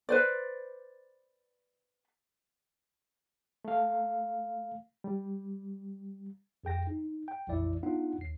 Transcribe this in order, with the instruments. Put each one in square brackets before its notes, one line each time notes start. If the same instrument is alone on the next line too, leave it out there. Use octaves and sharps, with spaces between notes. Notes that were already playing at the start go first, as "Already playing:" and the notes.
[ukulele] B4 C5 D5
[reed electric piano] A3 F5
G3
[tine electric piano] F2 G#4 G5 A#6
D#4
G5
A#1 F2 E3 E4 D5 E5
B3 D4 D#4 F4 F#5
D#2 C7